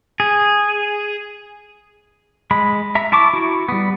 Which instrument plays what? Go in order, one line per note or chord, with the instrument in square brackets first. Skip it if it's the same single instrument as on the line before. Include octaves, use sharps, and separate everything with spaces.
[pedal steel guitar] G#4
G#3 B5
E5 A#5
E4 A5 C#6 D6
E4 F#4
G3 B3